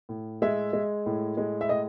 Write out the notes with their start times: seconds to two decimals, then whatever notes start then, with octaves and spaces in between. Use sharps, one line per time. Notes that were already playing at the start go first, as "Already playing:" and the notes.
0.09 A2
0.42 G#3 E5
0.73 G#3
1.06 A2
1.37 G#3
1.61 E5
1.69 A2 D#5